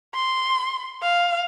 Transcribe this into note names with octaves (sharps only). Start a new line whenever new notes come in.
C6
F5